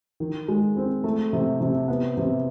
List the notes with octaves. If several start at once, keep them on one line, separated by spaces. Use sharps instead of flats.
D#3
G#3
C4
A3
C3
C3
B3
C3